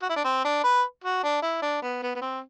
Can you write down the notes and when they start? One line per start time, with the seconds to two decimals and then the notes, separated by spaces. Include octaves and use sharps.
0.02 F#4
0.10 E4
0.16 D4
0.25 C4
0.45 D4
0.64 B4
1.04 F#4
1.24 D4
1.43 E4
1.62 D4
1.82 B3
2.03 B3
2.15 B3
2.22 C4